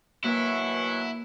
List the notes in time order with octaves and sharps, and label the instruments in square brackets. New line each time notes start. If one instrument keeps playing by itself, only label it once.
[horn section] B2 E3 F#3 [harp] A#3 [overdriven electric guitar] E4